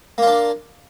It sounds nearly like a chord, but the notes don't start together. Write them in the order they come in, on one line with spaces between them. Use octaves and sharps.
A#3 F4 D4